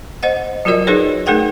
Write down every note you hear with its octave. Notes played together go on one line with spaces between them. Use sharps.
C5 D#5 F#5
F#3 F4 F#4 A#4 D5 D#5
D#4 F#4 G#4 B4 C#5
A3 D#4 G#4 A#4 F#5 G5